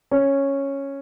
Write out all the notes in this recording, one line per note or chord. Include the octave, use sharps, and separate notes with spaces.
C#4